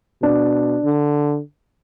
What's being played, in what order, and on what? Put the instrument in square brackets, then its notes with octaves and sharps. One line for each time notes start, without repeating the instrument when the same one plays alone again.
[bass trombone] B2 [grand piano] D4
[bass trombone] D3